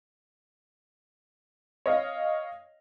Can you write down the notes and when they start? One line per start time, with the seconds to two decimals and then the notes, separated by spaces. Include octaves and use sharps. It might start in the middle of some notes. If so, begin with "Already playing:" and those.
1.86 C#5 D#5 F5